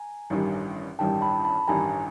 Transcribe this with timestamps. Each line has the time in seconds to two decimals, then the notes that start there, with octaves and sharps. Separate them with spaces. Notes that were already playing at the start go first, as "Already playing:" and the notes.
Already playing: G#5 A#5
0.30 A1 G2 D#3 G3
0.99 A1 G2 D#3 G3 G5 A5
1.21 A5 B5
1.45 A5 B5
1.67 A1 G2 D#3 G3 G#5 A#5